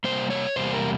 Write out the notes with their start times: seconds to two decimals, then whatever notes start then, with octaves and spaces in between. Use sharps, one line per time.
0.04 C3 G3 A#3 C5
0.30 C#5
0.56 E2 C3 G3 A#3 C5
0.74 A#4